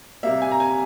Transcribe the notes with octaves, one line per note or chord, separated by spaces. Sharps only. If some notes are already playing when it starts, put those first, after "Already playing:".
C3 G3 A#3 E5
G#5
A#5
G#5